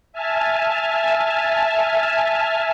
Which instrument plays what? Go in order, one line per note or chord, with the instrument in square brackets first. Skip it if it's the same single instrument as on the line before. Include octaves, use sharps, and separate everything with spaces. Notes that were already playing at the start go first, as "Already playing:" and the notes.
[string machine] E5 G#5 A5 F6